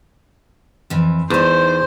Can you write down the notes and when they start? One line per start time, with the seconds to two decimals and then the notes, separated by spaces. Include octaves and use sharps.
0.90 F2 E3
1.30 E2 D#4 C5 A5